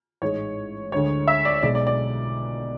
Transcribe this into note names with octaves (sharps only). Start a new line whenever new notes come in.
A1 G#2 G#3 C#5
D2 D3 G#3 C#5
E5
D5
B1 B2 G#3 D5
D5
D5